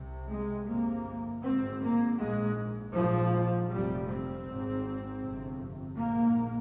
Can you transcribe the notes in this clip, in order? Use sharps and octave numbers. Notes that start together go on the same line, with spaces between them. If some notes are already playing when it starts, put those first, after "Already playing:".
Already playing: C2 C3
G#3
G1 F2 C3 A#3
G#1 G#2 C4
A#3
A#1 G#2 G#3
A#1 G#2 F3
F1 F2 C3 G3
C4
G#1 G#2
G1 F2 C3
A#1 G#2 A#3